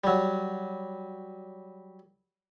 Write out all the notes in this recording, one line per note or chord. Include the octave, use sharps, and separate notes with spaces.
F#3 G3